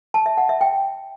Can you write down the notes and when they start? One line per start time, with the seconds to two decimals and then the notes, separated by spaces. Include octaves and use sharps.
0.14 A5
0.26 E5
0.38 F#5
0.49 E5
0.61 G5